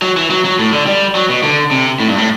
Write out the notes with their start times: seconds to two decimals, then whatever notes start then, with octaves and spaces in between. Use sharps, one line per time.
0.02 F#3
0.17 E3
0.30 F#3
0.45 F#3
0.59 A2
0.73 D3
0.86 G3
1.15 F#3
1.30 B2
1.43 D3
1.71 C3
2.00 A2
2.08 G2
2.18 A2